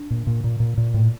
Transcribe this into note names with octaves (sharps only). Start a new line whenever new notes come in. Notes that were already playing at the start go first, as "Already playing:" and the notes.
Already playing: D4
A#2
A#2
A#2
A#2
A#2
A2